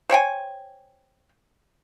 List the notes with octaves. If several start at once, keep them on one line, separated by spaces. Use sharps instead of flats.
C5 C#5 G5 G#5